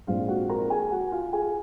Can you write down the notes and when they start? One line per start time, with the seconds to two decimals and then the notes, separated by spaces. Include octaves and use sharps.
0.07 A#1 G#2 F3 C4 F4 F5
0.28 F#4 F#5
0.49 A#4 A#5
0.70 G#4 G#5
0.91 F#4 F#5
1.12 F4 F5
1.33 G#4 G#5